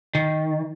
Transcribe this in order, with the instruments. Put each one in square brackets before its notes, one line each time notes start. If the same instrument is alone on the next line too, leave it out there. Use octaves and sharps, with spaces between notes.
[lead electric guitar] D#3